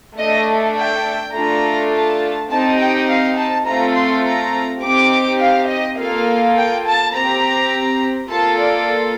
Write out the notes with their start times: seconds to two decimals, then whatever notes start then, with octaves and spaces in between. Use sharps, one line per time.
0.19 A3 D4 A4 D#5
0.78 G5
1.35 A3 D4 F4 A4 A#5
1.92 A5
2.51 C4 D#4 G4 A5
2.80 G5
3.09 F5
3.37 A5
3.66 A3 C4 F4 A4 A#5
3.96 C6
4.25 A#5
4.83 C4 D#4 G4 D6
5.41 F5
5.69 D#5
5.98 A#3 F4 A4 F5
6.56 G5
6.86 A5
7.14 C4 G4 A#5
8.31 A#3 F4 A4 A5
8.59 D5